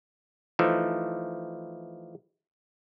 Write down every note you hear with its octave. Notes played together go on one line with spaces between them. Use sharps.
E3 F3 A3 D#4